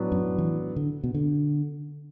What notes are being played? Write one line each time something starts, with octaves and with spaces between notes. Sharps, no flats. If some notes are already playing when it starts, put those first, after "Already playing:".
Already playing: A2 F#3 B3 D4
F#2
E3
D3
B2
D3